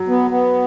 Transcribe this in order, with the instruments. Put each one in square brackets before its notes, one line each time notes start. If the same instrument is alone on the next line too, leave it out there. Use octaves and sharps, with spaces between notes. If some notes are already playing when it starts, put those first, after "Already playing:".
Already playing: [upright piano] F#3
[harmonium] B3
B3